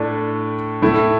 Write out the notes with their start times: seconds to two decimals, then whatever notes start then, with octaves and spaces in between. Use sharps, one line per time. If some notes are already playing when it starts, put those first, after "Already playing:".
Already playing: A2 A3 D4
0.82 A2 A3 E4